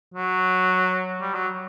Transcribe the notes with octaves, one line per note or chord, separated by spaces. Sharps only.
F#3
G3
F#3